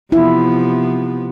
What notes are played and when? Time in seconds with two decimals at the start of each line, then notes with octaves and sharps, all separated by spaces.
0.12 C3 F3 B3 E4